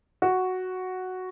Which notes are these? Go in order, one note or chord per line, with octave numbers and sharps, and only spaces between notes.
F#4